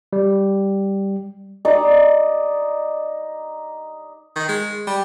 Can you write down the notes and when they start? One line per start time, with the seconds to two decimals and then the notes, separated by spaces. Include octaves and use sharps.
0.13 G3
1.65 D#4 D5 D#5
4.36 D#3
4.49 G#3
4.87 G3